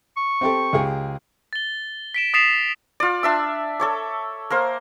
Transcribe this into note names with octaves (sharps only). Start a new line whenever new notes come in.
C#6
C4 G4 A4
C#2 G4 G#4
A6 G7
B6 D7 E7
D#6 A6 B6 C7 E7 F7
F4 D5
D4 E5 E6
A4 C#5 D6
A#3 A#4 C5